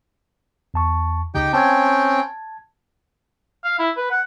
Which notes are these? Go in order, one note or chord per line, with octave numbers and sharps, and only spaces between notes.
E2 A5 C#6
D2 C#3 D#4 G4 G5
C4 C#4 G5 A5 G#6
F5
E4
B4
F#5